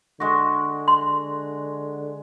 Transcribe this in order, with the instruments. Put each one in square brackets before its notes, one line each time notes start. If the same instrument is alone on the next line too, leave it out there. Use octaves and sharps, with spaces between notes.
[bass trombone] D3 [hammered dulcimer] G#3 F#4
[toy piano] C6